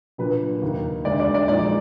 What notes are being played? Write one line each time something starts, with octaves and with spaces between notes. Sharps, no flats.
A#2 F#3 D4 B4
D#2 D#3 A#3
D2 D3 G#3 D5
D5
D5
A#2 F3 G#3 D#4 D5